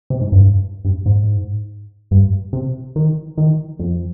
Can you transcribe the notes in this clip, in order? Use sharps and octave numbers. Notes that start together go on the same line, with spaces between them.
C3
G#2
G2
G2
G#2
G2
C3
D#3
D#3
F2